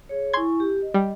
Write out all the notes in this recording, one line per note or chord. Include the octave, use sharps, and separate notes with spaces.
G#4 C#5
E4 G#5 C6 C#6 G#6
G4
D#5
G3